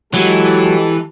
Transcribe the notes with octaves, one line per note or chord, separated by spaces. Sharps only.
E3 F#3 G#3 G4 A4